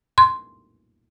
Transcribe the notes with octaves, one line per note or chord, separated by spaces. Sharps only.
C6